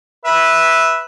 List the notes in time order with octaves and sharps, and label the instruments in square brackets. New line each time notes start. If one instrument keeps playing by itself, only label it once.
[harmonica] B4 E5